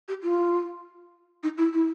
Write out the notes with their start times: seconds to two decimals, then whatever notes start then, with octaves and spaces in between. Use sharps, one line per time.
0.08 G4
0.23 F4
1.43 D#4
1.58 E4
1.73 E4